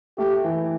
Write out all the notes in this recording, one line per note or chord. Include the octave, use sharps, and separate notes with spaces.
A3 G4
E3